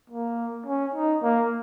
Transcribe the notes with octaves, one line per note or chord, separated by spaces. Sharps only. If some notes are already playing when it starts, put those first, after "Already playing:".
A#3
C#4
D#4
A#3